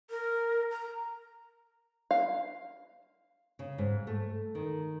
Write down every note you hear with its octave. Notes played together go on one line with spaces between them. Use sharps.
A#4
A#5
F5
C#3
G#2
A3
D#3